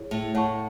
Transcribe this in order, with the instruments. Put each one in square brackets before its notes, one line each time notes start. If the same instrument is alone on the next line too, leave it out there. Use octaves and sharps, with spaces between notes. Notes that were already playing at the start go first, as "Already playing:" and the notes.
Already playing: [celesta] E4 G#4 C#5
[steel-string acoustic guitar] A2
[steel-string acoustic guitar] A2 [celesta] C#5 F#5 A5 C#6